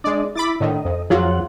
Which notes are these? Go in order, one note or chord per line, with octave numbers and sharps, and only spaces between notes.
G#3 D4 D5 D#5
E4 B5 D6 A6
A2 D3 D#3 D#5
F2
F2 F3 F#3 F4 G#4 F#5